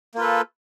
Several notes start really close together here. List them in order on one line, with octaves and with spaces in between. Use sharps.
A#3 F4 B4 A4